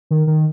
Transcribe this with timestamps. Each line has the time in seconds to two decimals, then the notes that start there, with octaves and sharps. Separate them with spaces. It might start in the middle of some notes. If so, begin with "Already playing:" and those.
0.11 D#3
0.27 D#3